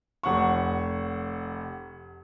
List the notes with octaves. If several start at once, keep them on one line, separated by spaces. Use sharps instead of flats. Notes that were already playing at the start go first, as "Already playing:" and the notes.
F1 F#5 C#6